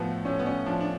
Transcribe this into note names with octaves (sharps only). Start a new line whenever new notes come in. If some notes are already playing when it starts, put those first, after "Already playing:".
Already playing: A2 F3 A3 B3
A2 C#4
B3
C#4
F3 D4
D4